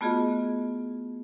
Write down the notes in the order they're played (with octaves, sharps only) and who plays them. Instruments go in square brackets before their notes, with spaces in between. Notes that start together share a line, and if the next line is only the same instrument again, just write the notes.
[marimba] A3 B3 F4 F#4 G#4 D#5